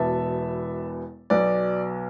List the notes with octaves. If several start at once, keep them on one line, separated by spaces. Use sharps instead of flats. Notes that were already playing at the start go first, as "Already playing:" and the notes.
Already playing: E1 E2 B2 B3 E5 A5
B1 B2 B3 D5